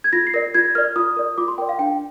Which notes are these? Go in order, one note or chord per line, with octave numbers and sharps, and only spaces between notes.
G#6
F4 A#6
C7
A#4 D5 A#6
F4 G#6
A#4 D5 F6
F4 D#6
A#4 D5
F4 D6
C6
A#4 D5 G5
F5
D4 G5